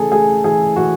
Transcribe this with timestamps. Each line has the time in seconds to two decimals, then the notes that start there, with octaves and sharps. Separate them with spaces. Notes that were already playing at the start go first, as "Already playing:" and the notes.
Already playing: C#3 E3 A3 G#4 A4
0.11 A3 G#4
0.44 E3 G#4
0.76 E3 F#4